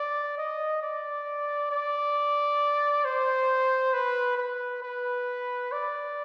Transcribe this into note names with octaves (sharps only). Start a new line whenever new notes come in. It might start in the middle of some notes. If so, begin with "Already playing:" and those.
Already playing: D5
D#5
D5
D5
C5
B4
B4
B4
D5